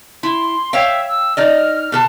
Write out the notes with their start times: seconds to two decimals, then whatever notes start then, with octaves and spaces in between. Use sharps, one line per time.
0.23 E4 C6
0.73 C#5 E5 F5 G5
1.08 E6
1.37 D#4 D5 D#5 F6
1.92 B2 A4 A5